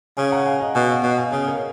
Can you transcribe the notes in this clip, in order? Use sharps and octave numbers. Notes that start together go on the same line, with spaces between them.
C#3 F5 G#5
F#5 A#5
F5 G#5
D#5 F#5
B2 F5 G#5
D#5 F#5
B2 D#5 F#5
F5 G#5
C#3 F5 G#5
A#4 C#5